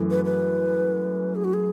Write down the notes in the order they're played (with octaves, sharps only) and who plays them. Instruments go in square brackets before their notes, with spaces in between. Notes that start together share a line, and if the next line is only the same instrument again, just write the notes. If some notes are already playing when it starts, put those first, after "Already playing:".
Already playing: [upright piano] F#2 E3 A3
[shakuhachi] B4
B4
G#4
F#4
G#4